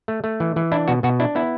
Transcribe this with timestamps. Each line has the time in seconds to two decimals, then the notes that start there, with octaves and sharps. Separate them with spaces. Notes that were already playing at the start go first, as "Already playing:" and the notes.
0.08 A3
0.24 A3
0.40 E3
0.56 E3
0.72 D4 E4
0.88 B2 F#4
1.03 B2 F#4
1.20 D4 E4
1.35 B3 E4